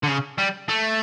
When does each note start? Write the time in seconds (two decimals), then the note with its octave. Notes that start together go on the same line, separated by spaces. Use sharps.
0.04 D3
0.08 C#3
0.38 G3
0.69 A3